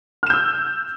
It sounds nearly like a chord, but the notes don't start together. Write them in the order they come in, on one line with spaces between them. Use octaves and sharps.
F6 E7 G6 E6